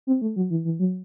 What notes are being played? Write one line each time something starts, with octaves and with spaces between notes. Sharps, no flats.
C4
A3
F#3
E3
E3
F#3